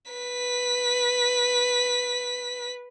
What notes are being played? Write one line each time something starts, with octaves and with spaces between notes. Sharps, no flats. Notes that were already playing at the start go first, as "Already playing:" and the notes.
B4 B6